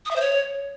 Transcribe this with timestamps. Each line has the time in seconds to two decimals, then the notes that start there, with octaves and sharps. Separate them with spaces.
0.05 D#6
0.11 E5
0.16 C5
0.21 C#5